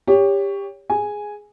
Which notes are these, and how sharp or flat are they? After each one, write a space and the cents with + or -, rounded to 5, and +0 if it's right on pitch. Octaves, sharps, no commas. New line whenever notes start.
G4 +20 C#5 +15
G#4 +0 G#5 +0